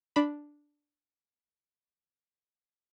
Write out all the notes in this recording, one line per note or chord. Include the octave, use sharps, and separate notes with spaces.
D4 B5